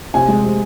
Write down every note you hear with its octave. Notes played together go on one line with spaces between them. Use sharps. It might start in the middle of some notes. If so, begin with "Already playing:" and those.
C3 G#5
G#3
C3